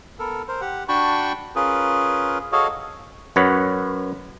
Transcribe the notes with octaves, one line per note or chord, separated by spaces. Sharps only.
B3 A4 A#4
A#4 C5
G4 F#5
D4 F#4 G5 A5 B5 C#6
C#4 F4 G#4 A#4 B4
F#4 G#4 A4 C#5 D#5 F5
F#2 B4 C#5 F#5